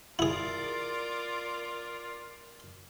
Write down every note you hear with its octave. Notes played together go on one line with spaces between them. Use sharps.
E4 F4 G#4 A#4 D5